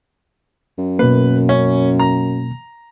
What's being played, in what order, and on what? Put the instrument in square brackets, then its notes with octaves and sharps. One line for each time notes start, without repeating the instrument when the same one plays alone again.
[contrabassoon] F#2
[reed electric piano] B2 A#3 [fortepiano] B4
[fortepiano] C#4
A#5